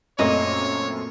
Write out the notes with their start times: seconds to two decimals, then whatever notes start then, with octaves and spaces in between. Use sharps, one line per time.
0.19 F#2 A#2 A3 A#3 C4 C#5 D#5